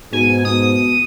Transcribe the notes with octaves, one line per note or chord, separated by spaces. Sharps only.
G#2 B2 G#5
B2 D#6